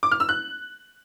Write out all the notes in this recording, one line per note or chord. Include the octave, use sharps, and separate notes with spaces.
D6
F6
E6
F#6